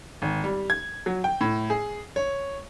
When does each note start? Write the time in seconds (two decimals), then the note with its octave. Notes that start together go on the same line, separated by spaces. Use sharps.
0.22 G#1
0.44 G3
0.70 G#6
1.06 F#3
1.24 G5
1.41 A2
1.70 G#4
2.16 C#5